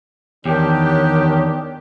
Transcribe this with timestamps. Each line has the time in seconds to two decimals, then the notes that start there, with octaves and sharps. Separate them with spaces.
0.45 E2 D#3 D4 G4 C#5